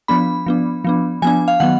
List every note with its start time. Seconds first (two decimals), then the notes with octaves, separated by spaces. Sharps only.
0.08 F3 B3 D4 B5
0.46 F3 B3 D4
0.84 F3 B3 D4
1.22 F3 B3 D4 G#5
1.48 F5
1.60 D#3 F#3 B3 F#5